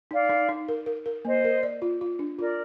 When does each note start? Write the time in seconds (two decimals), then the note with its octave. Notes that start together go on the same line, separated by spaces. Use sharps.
0.11 D#4 D5 F5
0.29 D#4
0.49 D#4
0.68 A#4
0.86 A#4
1.06 A#4
1.24 A#3 C5 D#5
1.44 A#4
1.63 D5
1.82 F4
2.01 F4
2.19 D4
2.39 F4 A#4 D5